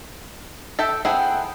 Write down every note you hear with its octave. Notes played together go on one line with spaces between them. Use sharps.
A4 E5 G5
C4 E4 G#4 A4 F#5 G5